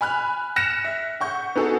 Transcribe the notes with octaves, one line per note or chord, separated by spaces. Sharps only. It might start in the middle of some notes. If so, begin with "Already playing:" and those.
G#5 B5 F6 F#6
F6 F#6 A#6 C#7 E7
E5
F#5 C#6 G6
B3 D#4 F#4 G#4 A4